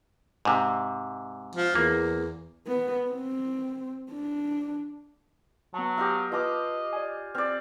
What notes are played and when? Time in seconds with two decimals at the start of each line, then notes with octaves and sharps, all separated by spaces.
0.45 G#2 C3
1.55 F3
1.75 E2 A#3
2.67 B3
3.11 C4
4.11 D4
5.74 F#3 B3 A5
5.98 G4 D#5 F5
6.32 F4 B4 D#5 A5 D6 E6
6.93 D5 G#5
7.35 C4 D5 F6